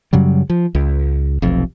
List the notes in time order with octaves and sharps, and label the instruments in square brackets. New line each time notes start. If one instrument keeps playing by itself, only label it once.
[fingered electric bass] F#2 C#3 F#3 G3
F3
C#2
F1 B1 F2